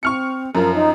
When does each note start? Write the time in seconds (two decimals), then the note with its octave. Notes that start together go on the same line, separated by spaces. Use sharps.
0.03 C4 C#6 F6 C#7
0.55 F#2 F3 A#4
0.74 D#4